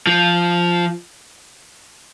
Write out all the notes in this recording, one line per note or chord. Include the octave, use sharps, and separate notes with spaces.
F3